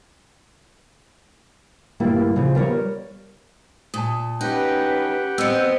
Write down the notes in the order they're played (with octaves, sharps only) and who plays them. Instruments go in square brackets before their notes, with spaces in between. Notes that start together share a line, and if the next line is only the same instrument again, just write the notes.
[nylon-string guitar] D2 G2 G3 A#3 E4
C#3 F3
G3 A#4 B4 C#5
[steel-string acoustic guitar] A#2 [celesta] A5 D#6
[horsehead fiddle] C#4 B4 [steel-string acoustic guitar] D#4 [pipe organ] G4 F#5 G5
[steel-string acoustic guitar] B3 C4 [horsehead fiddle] D#5 [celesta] E6 C#7